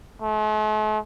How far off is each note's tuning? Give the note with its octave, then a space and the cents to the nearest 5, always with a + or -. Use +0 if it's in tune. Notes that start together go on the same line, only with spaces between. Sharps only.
A3 -45